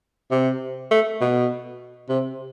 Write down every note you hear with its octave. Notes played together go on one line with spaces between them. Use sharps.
C3
A3
B2
C3